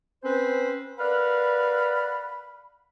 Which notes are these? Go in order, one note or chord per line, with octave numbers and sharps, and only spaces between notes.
C4 C#4 B4 C5
A#4 B4 D5 F5 F#5 B5